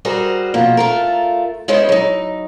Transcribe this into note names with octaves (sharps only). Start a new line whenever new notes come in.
G3 F#4 G#4 A#4 C5
F2 B2 F3 A#3
A3 F4 A#4
G#3 B3 C#4 E4 G#4 C5
F#3 D#4